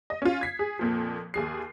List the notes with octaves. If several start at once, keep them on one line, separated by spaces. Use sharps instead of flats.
D#5
C#4 F4
G#6 B6 C7
G#4
F2 A#2 F3
D#2 G#4 C7